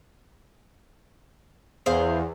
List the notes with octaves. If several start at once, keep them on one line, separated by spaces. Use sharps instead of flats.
E2 G#4 C5 F5